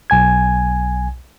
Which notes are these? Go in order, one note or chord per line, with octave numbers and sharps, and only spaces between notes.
B1 G#5 G#6